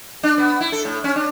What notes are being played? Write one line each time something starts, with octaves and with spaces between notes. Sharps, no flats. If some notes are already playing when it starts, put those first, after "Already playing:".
D4
B3
E4
A4
A2
C#4
D4